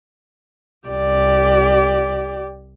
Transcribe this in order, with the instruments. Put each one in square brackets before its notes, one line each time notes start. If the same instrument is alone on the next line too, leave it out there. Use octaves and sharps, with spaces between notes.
[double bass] C2 [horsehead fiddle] G4 D5